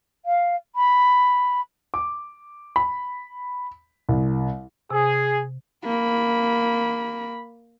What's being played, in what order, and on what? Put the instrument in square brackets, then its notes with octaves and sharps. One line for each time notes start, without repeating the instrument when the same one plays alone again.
[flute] F5
B5
[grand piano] D6
B5
C2
[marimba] C3 [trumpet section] G#4
[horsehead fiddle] A#3 B5